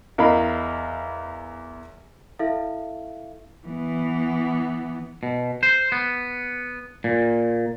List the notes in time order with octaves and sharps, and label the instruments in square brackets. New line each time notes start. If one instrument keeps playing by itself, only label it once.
[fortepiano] E2 A#4 D#5 F5 B5
[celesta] E4 A4 E5 F5
[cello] E3 B3
[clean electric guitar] B2
C5
B3
A#2